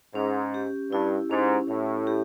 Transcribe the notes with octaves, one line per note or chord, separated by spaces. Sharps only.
G#2 C#4
G4
G2 E4
G#2 C#4
A2 C#4
G4